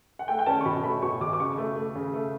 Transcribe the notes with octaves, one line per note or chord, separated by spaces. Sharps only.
F#5
A3 G5
G5
C#4 A5
C#6
B2 B5
A3 B5
B2 C#6
B2 D6
D6
C#3 C#6
A3
A3
C#3
A3